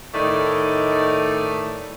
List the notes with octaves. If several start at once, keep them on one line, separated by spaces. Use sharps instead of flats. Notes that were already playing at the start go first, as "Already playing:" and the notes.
A2 D#3 A3 D#4 D5